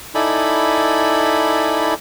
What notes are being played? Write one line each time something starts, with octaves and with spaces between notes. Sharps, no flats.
D#4 E4 A4 D5 G#5 B5